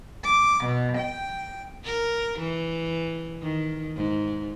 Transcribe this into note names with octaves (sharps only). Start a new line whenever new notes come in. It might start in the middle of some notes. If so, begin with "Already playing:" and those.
D6
B2
G5
A#4
E3
D#3
G#2